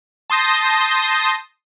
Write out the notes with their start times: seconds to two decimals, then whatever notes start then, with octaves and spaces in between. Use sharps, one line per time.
0.30 A5 C6 D#6 G6 A#6